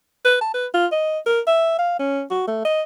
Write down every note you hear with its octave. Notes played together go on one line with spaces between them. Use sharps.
B4
A5
B4
F4
D#5
A#4
E5
F5
C#4
F#4
A3
D#5